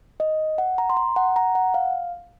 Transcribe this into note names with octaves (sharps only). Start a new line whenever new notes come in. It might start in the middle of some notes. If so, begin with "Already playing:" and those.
D#5
F#5
A#5
C6
A#5
F#5
A#5
F#5
F5